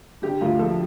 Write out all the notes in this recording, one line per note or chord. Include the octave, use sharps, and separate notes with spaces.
D3 G4
D2 F4
F3 A4